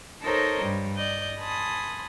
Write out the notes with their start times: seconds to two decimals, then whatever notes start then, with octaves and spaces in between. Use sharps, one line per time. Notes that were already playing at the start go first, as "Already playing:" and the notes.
0.22 D#4 A4 A#4 C5 C#5 D#5
0.61 G2 G3
0.95 D5 D#5 G6
1.39 G#5 A5 B5 C6 D#6